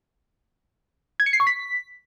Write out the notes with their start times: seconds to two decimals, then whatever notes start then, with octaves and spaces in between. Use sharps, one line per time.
1.20 G#6
1.26 C#7
1.33 C7
1.40 C#6
1.47 B6